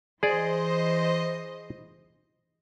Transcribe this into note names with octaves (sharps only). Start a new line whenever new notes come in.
E3 G#4 C5 D5 D#5